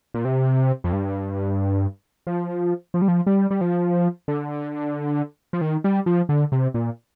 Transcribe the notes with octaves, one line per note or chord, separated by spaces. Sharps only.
A#2
C3
F2
G2
F3
F3
G3
F3
G3
G3
F3
D3
F3
D#3
G3
F3
D3
C3
A#2